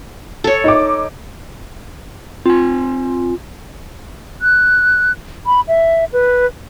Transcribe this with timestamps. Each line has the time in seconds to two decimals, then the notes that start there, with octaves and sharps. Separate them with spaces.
0.44 A4 C#5
0.64 D#4 D6
2.46 C4 F4 G#5
4.42 F#6
5.46 B5
5.68 E5
6.13 B4